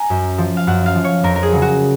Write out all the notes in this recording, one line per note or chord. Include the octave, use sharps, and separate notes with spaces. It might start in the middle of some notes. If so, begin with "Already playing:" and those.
Already playing: G#5 A#5
F#2
F3
F5
F#2 F#5
F5
F3
C#5
F2 A#4
A#4
G#4
C#3 F#3
F#4